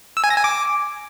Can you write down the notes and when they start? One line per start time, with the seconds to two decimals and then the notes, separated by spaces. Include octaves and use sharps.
0.17 E6
0.24 G#5
0.30 A#6
0.37 G#5
0.44 D6